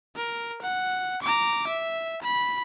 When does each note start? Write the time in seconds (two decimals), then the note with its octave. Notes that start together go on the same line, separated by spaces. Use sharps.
0.16 A#4
0.63 F#5
1.23 A#5 D6
1.68 E5
2.22 B5